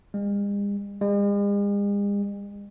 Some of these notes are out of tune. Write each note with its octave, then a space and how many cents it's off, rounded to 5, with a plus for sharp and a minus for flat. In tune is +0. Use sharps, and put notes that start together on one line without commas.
G#3 -45
G#3 -45